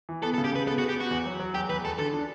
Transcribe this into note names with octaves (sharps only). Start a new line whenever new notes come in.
E3
B3 A4
A4
C#3
G4
C#3 B4
B3 A4
F#4
B3
G4
B3 F#4
E2
F#3
F#3
E2 G4
E2 B4
E2 A4
D3 A4
D4